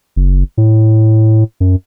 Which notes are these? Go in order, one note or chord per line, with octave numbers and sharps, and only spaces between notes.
F#1
A2
F#2